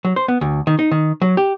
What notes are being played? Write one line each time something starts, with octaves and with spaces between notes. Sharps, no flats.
F#3
C5
B3
D2
D#3
D#4
D#3
F#3
G4